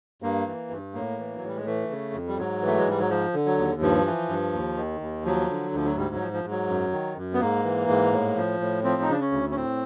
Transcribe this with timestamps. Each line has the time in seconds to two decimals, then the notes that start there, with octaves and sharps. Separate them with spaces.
0.22 G2 A#3
0.47 E3
0.70 G2
0.94 A2 A#3
1.18 E3
1.38 A2 F#3
1.48 G3
1.56 G#3
1.66 E3 A3
1.90 C#3
2.13 F2
2.28 G3
2.38 G#2 F#3
2.62 E3
2.67 A3
2.78 G#3
2.86 G#2 G3
3.00 F#3
3.10 F3
3.34 D3
3.46 F#3
3.58 D#2
3.81 G2 F3
4.06 E3
4.29 G2
4.53 D#2
4.77 D#3
5.01 D#2
5.25 F3 F#3
5.49 D3
5.73 D2 F3
5.85 F#3
5.97 G#2 G3
6.15 F#3
6.21 F3
6.33 F3
6.44 G#2
6.51 F#3
6.69 F#2
6.93 D#3
7.17 F#2
7.34 B3
7.40 G#2 A#3
7.64 E3
7.89 G#2
8.12 A2
8.36 F3
8.60 A2
8.84 F3 C4
9.02 D#4
9.08 C#3 D4
9.20 C#4
9.32 D2
9.51 C#4
9.56 A2 C4